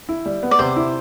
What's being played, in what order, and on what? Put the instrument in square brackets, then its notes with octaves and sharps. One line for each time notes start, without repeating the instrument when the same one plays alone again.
[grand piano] E4
G3
B3
[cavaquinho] D5
[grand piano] C3 [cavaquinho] C5
[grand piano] E4